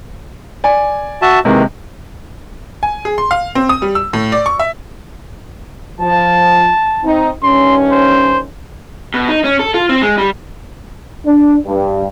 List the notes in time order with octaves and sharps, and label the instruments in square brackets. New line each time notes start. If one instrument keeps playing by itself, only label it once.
[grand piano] D5 G#5
[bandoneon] F#4 E5 A5
[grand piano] C3 G#3 [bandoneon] D#3 E3 A#3
[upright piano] G#5
G#4
C6
F5
C4
D#6
G3
E6
A2
D5
C#6
E5
[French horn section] F3 [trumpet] A5
[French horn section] C4 D#4
[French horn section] G2 D#3 C#4 [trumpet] C6
[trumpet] C5
[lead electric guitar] B2
D#4
C#4
A4
F4
C4
G#3
G3
[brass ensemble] D4
G2